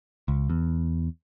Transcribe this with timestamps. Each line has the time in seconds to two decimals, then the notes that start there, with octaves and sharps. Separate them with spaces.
0.28 C#2
0.50 E2